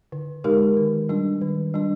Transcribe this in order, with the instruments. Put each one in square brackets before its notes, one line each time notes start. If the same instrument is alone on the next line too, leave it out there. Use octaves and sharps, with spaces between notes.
[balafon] D3
G#3 D#4 G4 A#4
D#3
G3 D4
D#3
G3 D4